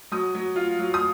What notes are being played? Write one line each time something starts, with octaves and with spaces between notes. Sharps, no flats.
F#3 D#6
F#3
F4
F#3
D#6